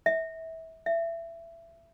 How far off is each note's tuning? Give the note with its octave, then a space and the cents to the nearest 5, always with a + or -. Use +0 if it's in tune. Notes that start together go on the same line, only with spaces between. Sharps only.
E5 -25
E5 +20